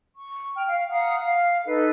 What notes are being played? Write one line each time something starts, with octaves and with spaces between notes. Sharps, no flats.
C#6
G5 F6
F5
F5 F#5 A#5 D#6
F5
D#4 A4 B4 D#5